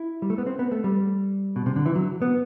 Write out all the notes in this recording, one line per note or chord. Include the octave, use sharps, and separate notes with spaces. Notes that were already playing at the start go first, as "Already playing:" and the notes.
Already playing: E4
G3
A3
B3
C4
B3
A3
G3
B2
C3
D3
E3
F#3
B3